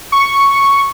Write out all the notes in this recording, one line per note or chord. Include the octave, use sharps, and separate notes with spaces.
C#6